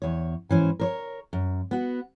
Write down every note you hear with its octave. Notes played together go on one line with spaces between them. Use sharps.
E2 C#5
G#2 E3 C#4 C5
A#4 C5 C#5
F#2
B3 F#4 F#5